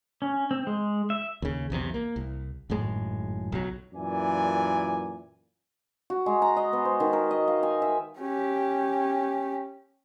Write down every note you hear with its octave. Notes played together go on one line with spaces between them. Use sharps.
C#4
C4
G#3
E5
D#2 C#3
B1 E2 C3
A#3
C2
G#1 F#2 A2 G#3
B1 F#3
F#2 A#2 E3 D5 G#5
F#4
G#3
A#5
D#5
B3
C5
D#3
A#4
D#5
F5
G#5
E5
C#4 G4